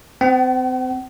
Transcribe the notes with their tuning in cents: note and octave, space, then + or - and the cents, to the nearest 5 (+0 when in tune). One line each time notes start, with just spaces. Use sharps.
C4 -30 F#5 +45